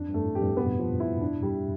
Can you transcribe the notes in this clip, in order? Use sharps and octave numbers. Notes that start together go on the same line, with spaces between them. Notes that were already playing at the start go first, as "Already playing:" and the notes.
Already playing: F2 D4
G2
A3
A2
F2 G4
G2
B2 B3
F3
E4
D4
G3